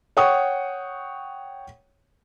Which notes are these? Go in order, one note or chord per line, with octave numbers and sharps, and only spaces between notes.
C#5 F#5 G5 C#6 D#6